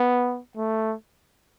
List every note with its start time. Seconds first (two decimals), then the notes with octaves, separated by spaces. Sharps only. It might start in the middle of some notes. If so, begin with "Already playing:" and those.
Already playing: B3
0.57 A3